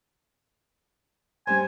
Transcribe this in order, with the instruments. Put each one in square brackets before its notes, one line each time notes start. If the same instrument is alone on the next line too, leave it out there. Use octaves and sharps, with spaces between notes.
[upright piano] G2 G3 C5 [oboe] G#5